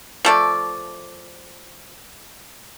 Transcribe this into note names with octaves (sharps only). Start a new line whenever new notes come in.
F3 A3 D5